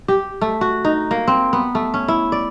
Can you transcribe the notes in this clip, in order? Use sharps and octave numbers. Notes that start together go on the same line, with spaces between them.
G4
A3
F#4
D#4
A#3
C4
B3
A3
C#4
E4
D5